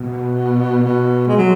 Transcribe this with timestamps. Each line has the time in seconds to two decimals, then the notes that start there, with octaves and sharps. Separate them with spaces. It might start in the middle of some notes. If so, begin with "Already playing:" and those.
Already playing: B2
0.83 B2
1.27 G#3
1.37 F#3